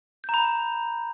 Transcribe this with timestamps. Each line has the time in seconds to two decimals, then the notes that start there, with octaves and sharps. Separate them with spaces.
0.24 G6
0.29 A#5
0.34 B5